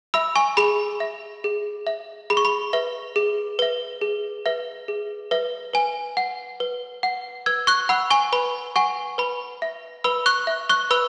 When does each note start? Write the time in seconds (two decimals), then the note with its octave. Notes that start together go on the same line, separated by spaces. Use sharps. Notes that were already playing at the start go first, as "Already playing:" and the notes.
0.14 E5 B5 E6
0.36 G#5 C#6
0.57 G#4 B5
1.00 E5
1.44 G#4
1.87 E5
2.30 G#4 B5
2.37 C#6
2.45 B5
2.73 B4 E5
3.16 G#4
3.59 B4 E5
4.01 G#4
4.46 B4 E5
4.88 G#4
5.31 B4 E5
5.74 B4 G#5
6.17 F#5
6.60 B4
7.03 F#5
7.46 B4 E6 G#6
7.67 C#6 F#6
7.89 F#5 B5 E6
8.10 G#5 C#6
8.33 B4 B5
8.76 F#5 G#5 C#6
9.18 B4 B5
9.62 E5
10.04 B4 B5 E6
10.26 C#6 F#6
10.47 E5
10.69 C#6 F#6
10.91 B4 B5 E6